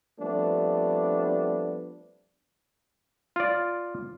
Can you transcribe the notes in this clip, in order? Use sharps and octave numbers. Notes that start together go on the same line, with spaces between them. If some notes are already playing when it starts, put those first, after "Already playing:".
F3 G3 A3 B3 C4 D4
F4 D5